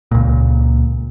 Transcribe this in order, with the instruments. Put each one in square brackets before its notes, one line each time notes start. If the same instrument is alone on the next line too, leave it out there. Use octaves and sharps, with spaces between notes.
[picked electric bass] C#2 A#2